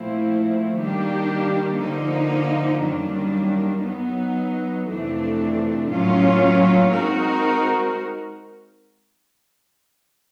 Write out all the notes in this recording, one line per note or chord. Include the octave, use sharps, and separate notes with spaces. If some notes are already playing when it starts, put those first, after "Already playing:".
Already playing: A#2 F3 A3 C4 E4
D#3 G3 A#3 D4 G4
D3 F3 A#3 D#4
F#2 D#3 G3 A#3 D4
F#3 B3 D#4
F2 C3 E3 A3 D4
A2 F#3 A#3 C#4 F4
G#3 C4 D#4 F#4 A#4